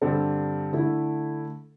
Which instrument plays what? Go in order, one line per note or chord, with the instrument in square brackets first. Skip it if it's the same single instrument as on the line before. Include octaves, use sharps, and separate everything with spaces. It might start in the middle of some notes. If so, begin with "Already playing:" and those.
[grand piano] G2 D3 G3 C4 A4
D3 A3 E4